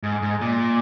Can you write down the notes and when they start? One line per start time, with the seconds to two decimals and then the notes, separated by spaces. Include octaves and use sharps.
0.03 G#2
0.22 G#2
0.41 A#2